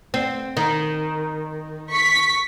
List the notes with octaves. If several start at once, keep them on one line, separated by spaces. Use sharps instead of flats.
C4
D#3
C#6 B6